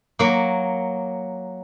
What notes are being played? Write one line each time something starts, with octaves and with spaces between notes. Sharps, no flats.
F#3 A#3